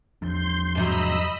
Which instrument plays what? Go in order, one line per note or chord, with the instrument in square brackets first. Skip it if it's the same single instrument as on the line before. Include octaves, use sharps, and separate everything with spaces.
[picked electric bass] E2 F3 D4 [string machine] C6 G6
[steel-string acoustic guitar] G#2 C3 F#3 [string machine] D#5 B5 E6